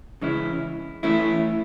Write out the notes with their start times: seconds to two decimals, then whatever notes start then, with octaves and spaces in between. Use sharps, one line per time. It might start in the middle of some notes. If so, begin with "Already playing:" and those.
0.21 C#3 E3 G#3 C#4 E4
1.03 E3 A3 C#4 E4